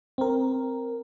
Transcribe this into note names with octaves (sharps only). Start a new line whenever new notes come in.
C4 A#4